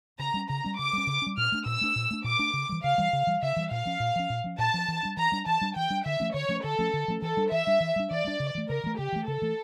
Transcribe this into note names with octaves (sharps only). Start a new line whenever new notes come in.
C#3 A#5
G3 C#4
C#3 A#5
G3 C#4
C#3 D6
G3 C#4
C#3
G3 C#4
A#2 F6
A3 D4
A#2 E6
A3 D4
A#2
A3 D4
A#2 D6
A3 D4
C#3
E3 G3
C#3 F5
E3 G3
C#3
E3 G3
C#3 E5
E3 G3
A#2 F5
F3 C#4
A#2
F3 C#4
A#2
F3 C#4
A#2 A5
F3 C#4
E3
G3 D4
E3 A#5
G3 D4
E3 A5
G3 D4
E3 G5
G3 D4
D3 E5
F3 A3 C#4
D3 C#5
F3 A3 C#4
D3 A4
F3 A3 C#4
D3
F3 A3 C#4
E3 A4
G3 D4
E3 E5
G3 D4
E3
G3 D4
E3 D5
G3 D4
C#3
E3 A3
C#3 A#4
E3 A3
C#3 G4
E3 A3
C#3 A4
E3 A3